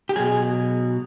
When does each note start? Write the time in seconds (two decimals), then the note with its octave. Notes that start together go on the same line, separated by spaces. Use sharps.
0.09 G4
0.16 B2 F#3 G#4